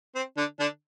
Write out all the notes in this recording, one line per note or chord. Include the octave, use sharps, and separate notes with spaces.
C4
D3 D4
D3 D4